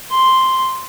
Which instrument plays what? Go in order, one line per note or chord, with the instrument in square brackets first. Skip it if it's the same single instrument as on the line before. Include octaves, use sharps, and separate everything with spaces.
[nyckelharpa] C6